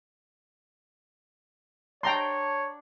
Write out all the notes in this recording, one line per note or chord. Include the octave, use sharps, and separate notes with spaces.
D4 C#5 G5 A#5 C6